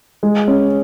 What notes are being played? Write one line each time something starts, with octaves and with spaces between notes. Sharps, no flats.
G#3
C#4